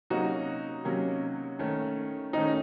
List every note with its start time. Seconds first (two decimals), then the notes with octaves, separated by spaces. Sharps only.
0.10 C3 F#3 A#3 C#4 D#4 F#4
0.85 C3 F#3 A#3 C#4
1.59 D#3 A3 C#4
2.33 D#3 A3 C#4 D#4